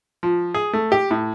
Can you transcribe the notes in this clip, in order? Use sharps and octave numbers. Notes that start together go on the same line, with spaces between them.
F3
G#4
A3
G4
A2